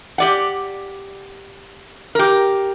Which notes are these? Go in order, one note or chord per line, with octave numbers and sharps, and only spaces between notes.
G4 D5 F#5
G4 A#4